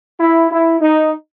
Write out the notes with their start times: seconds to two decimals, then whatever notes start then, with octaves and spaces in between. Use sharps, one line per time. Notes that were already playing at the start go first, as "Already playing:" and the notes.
0.20 E4
0.51 E4
0.81 D#4